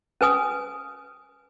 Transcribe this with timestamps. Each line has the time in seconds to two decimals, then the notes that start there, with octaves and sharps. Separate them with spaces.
0.21 C#4 B4 G#5 D#6